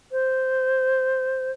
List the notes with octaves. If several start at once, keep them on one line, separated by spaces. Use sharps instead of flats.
C5